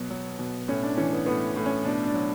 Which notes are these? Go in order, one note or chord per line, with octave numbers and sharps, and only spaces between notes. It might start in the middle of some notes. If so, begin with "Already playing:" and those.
Already playing: B2 F#3 B3
F#3
B2
A2 C#4
D4
E3 C#4
B3
A2 B3
A2
C#4
B2 D4
D4
F#3